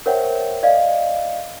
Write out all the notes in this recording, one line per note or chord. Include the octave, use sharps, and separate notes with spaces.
A#4 C5 C#5 E5 F#5 G5
D5 D#5 F5